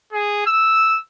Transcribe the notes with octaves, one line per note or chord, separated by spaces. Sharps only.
G#4
E6